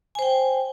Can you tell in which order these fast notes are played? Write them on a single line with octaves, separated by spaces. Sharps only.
G#5 C5 G5